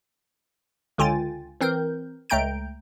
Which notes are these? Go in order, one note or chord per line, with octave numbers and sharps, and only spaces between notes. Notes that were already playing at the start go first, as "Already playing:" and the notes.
C#2 D3 F4 G5 G#5 A6
E3 C4 A#4 G6
C#2 A3 G5 A#5 G6 D7